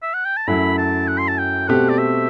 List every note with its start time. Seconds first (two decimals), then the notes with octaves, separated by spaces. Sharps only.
0.02 E5
0.13 F#5
0.25 G5
0.37 A5
0.47 F#2 F#3 A3 E4 B5
0.78 A5
1.08 F#5
1.18 C6
1.28 A5
1.38 G5
1.68 B2 A3 C4 G4 F#5
1.89 D5
1.98 E5